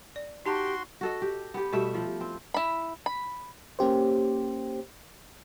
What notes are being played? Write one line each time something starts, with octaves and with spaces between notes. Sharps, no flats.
D5
D#4 F#4 G4 A5 A#5 C6
F#4 A4 D#5
G4
B3 G4
B2 G3 A3 E5
F3
C4
E4 B5
B5
A#3 C#4 G4 C5